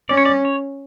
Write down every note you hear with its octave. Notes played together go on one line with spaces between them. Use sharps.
C#4 D5
C#5
D5
C#5